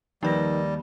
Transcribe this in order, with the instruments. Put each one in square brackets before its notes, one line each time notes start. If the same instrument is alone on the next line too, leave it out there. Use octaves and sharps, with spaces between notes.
[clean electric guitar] D#2 [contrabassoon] D#3 [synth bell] F3 B4 A#6 [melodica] G3